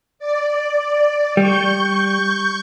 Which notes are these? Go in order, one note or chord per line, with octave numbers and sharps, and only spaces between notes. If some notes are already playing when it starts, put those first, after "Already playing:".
D5
G3 C#6 G6